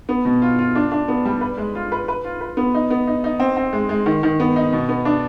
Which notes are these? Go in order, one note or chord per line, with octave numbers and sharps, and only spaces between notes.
B3
B2
F4
F4
D4
D4
B3
G3
B4
G#3
F4
B4
B4
F4
B4
B3
D#4
B3
D#4
D#4
C4
C4
G#3
G#3
D#3
D#3
B3
D#4
B2
B3
D4